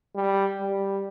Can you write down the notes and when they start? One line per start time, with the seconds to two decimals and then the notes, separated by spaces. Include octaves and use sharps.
0.15 G3
0.61 G3